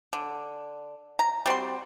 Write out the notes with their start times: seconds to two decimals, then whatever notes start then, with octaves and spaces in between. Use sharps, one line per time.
0.13 D3
1.19 A#5
1.46 G3 C4 F#4 C6